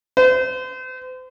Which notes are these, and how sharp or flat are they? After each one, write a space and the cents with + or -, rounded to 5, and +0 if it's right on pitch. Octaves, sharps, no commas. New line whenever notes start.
C5 -40